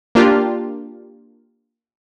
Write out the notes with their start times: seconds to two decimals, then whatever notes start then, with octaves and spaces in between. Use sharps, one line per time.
0.15 A#3 D4 F4 G4